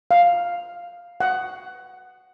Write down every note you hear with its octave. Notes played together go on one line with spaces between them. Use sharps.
F5
F#5